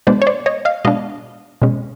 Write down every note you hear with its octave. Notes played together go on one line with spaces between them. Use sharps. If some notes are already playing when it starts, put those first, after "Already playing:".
B2 G#3 B3 D4 C5 D5
C#5
C5 D5
C#5 D#5
D#5 F5
B2 G#3 B3 D4 D#5 F5
B2 G#3 C#4